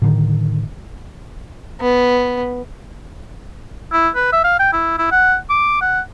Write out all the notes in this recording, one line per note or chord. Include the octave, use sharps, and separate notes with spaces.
A2 D3 D#3
B3
E4
B4
E5
F5
G5
E4
E4
F#5
D6
F#5